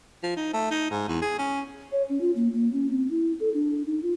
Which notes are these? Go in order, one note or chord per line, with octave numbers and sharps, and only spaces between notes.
F3
D#4
A3
D#4
G#2
E2
G#4
C#4
C#5
C#4
F4
A#3
A#3
C#4
C4
E4
A4
D4
D#4
F4